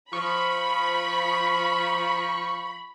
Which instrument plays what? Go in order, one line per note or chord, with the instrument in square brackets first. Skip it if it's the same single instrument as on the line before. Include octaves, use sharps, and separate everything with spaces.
[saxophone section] F3 [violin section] B5 [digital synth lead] C#6